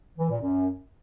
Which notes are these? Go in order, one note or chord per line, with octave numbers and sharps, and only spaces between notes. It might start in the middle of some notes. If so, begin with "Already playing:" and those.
E3
A#2
F#2